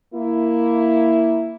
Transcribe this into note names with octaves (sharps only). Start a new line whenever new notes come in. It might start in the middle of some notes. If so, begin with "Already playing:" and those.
A#3 E4